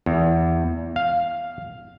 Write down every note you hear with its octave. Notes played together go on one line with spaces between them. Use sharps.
E2
F5